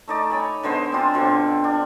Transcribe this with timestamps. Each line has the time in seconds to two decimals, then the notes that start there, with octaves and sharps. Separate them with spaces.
0.08 A3 D#4 D5
0.30 C#5 G#5 B5
0.63 D3 G#3 B3 C5
0.92 C4 D4 F4
1.14 B2 D3 C4
1.64 D4